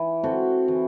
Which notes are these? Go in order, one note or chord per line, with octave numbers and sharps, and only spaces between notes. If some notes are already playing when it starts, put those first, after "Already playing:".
Already playing: E3
C4 F#4 A4
E3